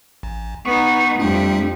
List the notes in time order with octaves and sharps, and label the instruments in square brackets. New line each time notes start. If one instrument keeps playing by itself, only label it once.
[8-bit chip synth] A1
[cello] B3 D#4 [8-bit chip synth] C#6
[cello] F2 G4 [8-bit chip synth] G3 A3 D4